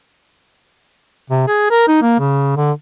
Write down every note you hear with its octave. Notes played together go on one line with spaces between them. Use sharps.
C3
G#4
A#4
D#4
A#3
C#3
D3